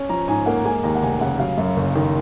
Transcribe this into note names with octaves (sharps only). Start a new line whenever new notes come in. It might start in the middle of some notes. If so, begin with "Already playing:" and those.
Already playing: C#4
F3 A#5
G#2 G#5
A#3 F#5
G#3 G#5
D#2 A#5
F#5
F1 G#5
C#3 F#5
F#3 F5
F#2
F#1
D#3